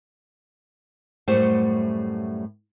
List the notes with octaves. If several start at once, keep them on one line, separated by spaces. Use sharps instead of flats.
F#2 A2 G3 A3 C5 F#5